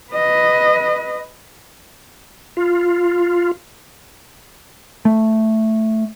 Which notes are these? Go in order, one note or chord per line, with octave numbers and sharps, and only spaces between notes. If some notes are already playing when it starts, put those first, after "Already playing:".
B4 D#5
F4
A3